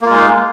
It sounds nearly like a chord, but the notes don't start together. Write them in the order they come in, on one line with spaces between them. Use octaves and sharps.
A#3 F4 G#3 D#4